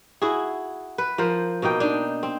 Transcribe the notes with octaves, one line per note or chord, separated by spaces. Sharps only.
E4 F#4 G#4
B4
F3 A#4 C5
B2 A#3 D#4 G5
D4 D#4
C4